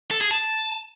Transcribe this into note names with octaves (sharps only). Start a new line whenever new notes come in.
A4
G#4
A5